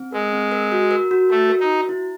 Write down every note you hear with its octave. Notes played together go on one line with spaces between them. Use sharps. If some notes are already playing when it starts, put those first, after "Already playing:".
Already playing: C4
G#3 A#4
C4
A#4
F#4
A#4
F#4
A3 F#4
A#4
D#4
F#4
E4